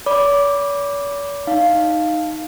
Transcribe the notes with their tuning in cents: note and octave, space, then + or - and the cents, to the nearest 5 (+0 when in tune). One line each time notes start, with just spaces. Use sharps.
C#5 +45 B5 -10 D6 +0
D#4 +0 F5 +0